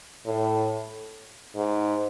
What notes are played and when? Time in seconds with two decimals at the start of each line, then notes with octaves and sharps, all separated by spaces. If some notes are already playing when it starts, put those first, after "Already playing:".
0.26 A2
1.55 G#2